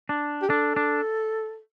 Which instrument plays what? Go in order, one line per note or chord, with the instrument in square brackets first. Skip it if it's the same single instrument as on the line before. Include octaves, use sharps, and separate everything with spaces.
[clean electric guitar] D4
[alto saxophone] G4
[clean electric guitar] D4 [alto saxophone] A4
[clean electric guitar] D4